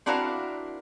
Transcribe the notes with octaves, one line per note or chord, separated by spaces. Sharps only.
C4 D4 E4 F#4 A#4 F5